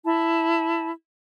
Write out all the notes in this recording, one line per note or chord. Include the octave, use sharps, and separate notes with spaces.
E4 A5